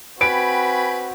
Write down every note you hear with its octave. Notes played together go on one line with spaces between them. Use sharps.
C4 F#4 B4 G5 G#5 B5 D7